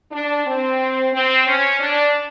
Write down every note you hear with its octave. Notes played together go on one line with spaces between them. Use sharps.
D4
C4
C4
C#4
D4